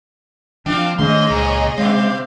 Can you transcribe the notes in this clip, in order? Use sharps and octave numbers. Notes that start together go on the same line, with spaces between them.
F3 C4 D4 F4 F5 F#5
G#2 D#3 A3 D4 G#4 C#5 D#5 C6
C#2 A#2
B2 G#3 C4 F5